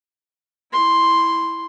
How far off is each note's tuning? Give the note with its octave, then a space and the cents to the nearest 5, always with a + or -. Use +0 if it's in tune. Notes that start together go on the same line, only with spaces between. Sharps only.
E4 +0 C6 +0